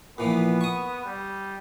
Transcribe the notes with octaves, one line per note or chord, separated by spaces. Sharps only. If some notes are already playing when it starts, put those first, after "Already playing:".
A#2 E3 F3 B3
C#6 D#6
G3